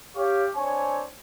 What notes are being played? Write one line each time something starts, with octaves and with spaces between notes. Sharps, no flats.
G4 C#5 F5 C#6
C4 D4 C#5 G#5